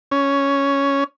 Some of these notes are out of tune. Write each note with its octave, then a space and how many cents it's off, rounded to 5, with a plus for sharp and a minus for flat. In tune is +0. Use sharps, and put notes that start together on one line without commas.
C#4 +5